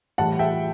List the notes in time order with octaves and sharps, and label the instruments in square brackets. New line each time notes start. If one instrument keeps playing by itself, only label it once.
[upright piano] A2 E3 G3 F#5 A5
E5 G5